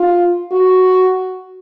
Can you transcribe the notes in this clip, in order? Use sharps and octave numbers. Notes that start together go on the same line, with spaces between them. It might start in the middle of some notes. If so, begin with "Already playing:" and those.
Already playing: F4
F#4